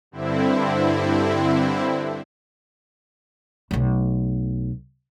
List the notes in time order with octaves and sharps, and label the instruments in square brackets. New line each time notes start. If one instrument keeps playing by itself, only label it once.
[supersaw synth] G2 D3 C4 E4
[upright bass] B1 A3